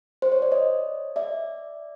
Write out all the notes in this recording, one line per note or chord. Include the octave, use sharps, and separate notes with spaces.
C5
C#5
D5
C#5 D#5
D5 E5